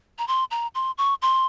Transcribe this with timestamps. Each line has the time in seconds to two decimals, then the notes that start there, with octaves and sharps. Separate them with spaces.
0.18 A#5
0.28 C6
0.51 A#5
0.75 C6
0.98 C#6
1.22 C6